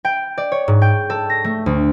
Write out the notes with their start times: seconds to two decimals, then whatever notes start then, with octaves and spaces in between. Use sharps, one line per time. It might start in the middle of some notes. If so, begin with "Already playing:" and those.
0.05 G5
0.38 D5
0.52 C#5
0.68 G#2
0.82 G5
1.10 A4
1.30 A#6
1.44 A3
1.66 D2